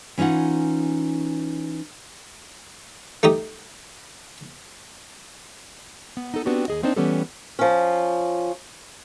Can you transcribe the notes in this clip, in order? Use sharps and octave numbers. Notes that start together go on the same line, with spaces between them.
E3 C#4 D#4 F4 F#5
A3 D#4 G4 D#5
B3
D#4 A4
B3 C4 D4 F#4 G4
D#2 G#4 D#5
A#3 C4 D4 D#4 C5
E3 G3 B3 C#4 G4 A4
F3 C#4